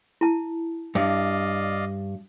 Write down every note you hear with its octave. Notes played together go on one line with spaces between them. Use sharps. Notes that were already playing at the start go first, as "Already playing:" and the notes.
E4 A5
G2 D5 D#5 F5